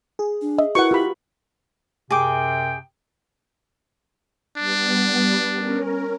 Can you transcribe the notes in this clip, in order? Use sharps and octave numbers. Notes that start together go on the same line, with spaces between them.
G#4
D4
D#5 E5
E4 F#4 A#4 B4 F#5 C#6
F4 G4 B5
F#2 C3 G#4 G5 D6
G3 B3 D4
C#4 A#4